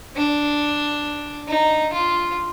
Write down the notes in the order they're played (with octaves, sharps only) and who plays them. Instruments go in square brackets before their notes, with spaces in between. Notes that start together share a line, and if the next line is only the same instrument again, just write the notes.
[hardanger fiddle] D4
D#4
F4